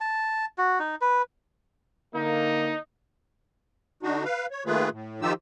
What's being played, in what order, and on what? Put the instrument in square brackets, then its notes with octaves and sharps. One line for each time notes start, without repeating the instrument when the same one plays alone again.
[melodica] A5
F#4
D#4
B4
[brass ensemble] D3 A#3 [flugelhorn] D#4
[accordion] D3 D4 D#4 F#4
B4 F5
C#5
D#3 A3 A#3 F4 G#4 B4
A2
D#3 F3 D#4 F4 G4 E6